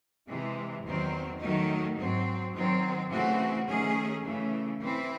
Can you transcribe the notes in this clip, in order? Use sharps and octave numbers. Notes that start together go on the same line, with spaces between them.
C3 E3 G#3
E2 D#3 F#3 C4
D#3 F#3 A3 D#4
G#2 F#3 C4
D#3 F#3 C4
C#3 E3 A3 C4 F#4
D#3 A3 C#4 G#4
C#3 E3 A3
E3 C4 E4